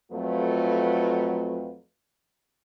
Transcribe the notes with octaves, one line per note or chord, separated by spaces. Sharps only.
F2 F#3 A3 F4 B4